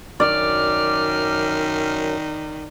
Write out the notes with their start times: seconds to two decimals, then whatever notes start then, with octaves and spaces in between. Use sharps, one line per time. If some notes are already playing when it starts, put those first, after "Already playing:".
0.20 F#2 D#3 D5 F6